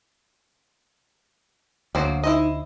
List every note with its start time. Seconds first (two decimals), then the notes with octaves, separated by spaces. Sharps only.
1.95 D2 F#3 A#3 C5
2.24 D#4 E4 C5 D#5